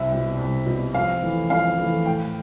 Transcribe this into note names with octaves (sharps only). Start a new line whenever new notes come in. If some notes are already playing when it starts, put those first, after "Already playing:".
Already playing: C2 E5
B2 G3
C2
B2 G3
F2 F5
E3 A3
F2 F5
E3 A3
A2 G5